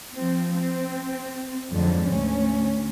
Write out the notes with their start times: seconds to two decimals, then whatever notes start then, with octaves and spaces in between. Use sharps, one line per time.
0.15 F3 C4
0.59 C4
1.71 F2 G#2 D3 F3 F#3
2.10 D2 C#4